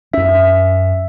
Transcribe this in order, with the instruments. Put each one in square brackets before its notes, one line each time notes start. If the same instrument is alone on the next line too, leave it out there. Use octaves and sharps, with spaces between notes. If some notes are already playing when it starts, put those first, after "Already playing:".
[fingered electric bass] F#2 C#4 [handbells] E5